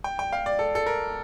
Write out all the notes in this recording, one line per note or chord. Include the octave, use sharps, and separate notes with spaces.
G5
G5
F5
D5
A4
A4
A#4